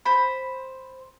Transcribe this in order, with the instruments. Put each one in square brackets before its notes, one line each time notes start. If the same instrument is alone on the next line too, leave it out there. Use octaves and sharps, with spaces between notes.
[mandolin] C5 B5